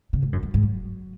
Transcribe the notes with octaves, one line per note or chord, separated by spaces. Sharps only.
C#3
G#2
F#2
F#2
G#2
F#3